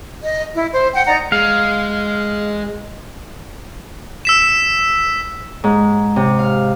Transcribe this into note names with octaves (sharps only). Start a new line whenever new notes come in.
D#5
E4
C5
F#5 G5
D#4 D5 F#5 A#5
G#3 F5
E6 B6 E7
G#2
C3
F5